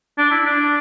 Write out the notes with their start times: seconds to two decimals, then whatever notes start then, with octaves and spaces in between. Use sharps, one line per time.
0.18 D4
0.31 E4
0.46 D4